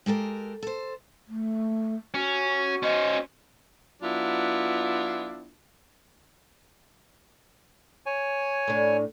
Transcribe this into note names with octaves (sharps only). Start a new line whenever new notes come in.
G#3 G4 A4 A#4
A4 C5
A3
C#4 F#4
C#4 C5 D#5
F#3 B3 D4 E4 F4
C#5 G#5
A2 D4